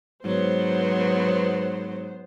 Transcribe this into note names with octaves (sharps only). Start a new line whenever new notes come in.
G#2 F#3 B3 C5